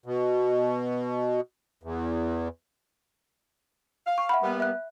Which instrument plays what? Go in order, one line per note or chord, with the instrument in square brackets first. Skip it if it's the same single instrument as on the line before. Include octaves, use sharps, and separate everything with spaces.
[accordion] B2
E2
[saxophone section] F5
[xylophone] C#6
E5 F#5 B5
[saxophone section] G3 A#3 B3
[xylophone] E5 F#6